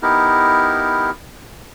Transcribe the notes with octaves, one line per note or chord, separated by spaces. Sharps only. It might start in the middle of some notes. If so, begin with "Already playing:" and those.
B3 D#4 E4 G4 A#4